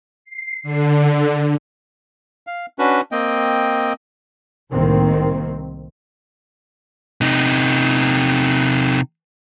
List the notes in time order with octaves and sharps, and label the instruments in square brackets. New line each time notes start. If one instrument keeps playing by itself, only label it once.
[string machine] C7
D3
[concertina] F5
C#4 D4 F#4 B4
A#3 C4 D#5 G5
[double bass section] C2 A2 D#3 A#3 C4
[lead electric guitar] C3 D#4